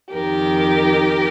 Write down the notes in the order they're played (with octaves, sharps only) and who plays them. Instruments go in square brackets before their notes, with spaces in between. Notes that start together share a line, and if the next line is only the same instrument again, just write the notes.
[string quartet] F2 D#3 G4 A#4